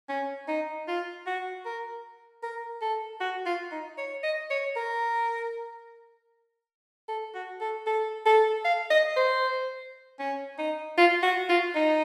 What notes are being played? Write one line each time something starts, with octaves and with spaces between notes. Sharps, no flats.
C#4
D#4
F4
F#4
A#4
A#4
A4
F#4
F4
D#4
C#5
D#5
C#5
A#4
A4
F#4
A4
A4
A4
F5
D#5
C5
C#4
D#4
F4
F#4
F4
D#4